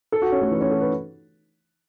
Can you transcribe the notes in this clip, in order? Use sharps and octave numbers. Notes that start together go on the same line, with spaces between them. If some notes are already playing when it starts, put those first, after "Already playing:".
A4
F#4
C#4
A3
E3
C#4
A4
B4